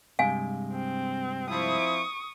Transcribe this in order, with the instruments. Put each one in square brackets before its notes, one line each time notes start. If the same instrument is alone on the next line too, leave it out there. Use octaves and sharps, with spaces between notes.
[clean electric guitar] G2 C3 G#3 [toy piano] F5 G#5
[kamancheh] C4
[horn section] F3 C4 E4 [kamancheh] C#6 D#6